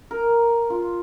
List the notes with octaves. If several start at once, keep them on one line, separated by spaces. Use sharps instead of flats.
A#4
F4